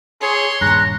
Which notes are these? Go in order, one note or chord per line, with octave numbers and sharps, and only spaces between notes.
G#4 C#5 C6
D#1 G2 A#5 F#6